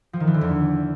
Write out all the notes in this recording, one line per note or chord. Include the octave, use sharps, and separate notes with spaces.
F3
D#3
E3
D3
E2